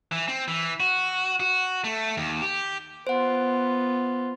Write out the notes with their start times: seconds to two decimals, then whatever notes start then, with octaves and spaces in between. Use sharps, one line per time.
0.12 E3
0.28 C4
0.48 E3
0.80 F#4
1.40 F#4
1.84 A3
2.17 D#2
2.42 G4
3.07 B3 F4 C5 F#5